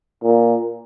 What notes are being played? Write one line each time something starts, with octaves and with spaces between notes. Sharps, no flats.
A#2